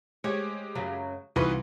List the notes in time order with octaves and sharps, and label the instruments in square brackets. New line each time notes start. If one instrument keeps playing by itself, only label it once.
[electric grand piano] G#3 G4 [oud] C#5
[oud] F#2 C#3 F#3
[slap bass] C2 [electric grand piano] E3 F#4 B5 [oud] D#4 F4 B4